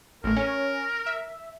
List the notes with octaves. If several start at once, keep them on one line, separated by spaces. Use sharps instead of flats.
A1 A2 A#4
C#4
E5